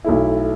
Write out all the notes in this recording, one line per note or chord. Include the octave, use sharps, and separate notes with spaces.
B1 B2 A3 E4